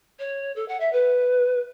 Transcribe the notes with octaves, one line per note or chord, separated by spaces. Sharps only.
C#5
A4
F#5
E5
B4